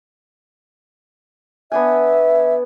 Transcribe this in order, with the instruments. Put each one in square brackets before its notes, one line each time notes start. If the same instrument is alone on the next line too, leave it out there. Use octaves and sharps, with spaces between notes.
[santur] B3 D4 G#5 [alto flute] E5